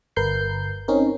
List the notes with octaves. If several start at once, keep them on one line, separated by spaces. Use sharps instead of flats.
G1 A#4 B4 G6 C7
C4 C#4 D#4 A#4